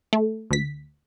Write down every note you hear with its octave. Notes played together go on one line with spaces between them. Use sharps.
A3
D2 B6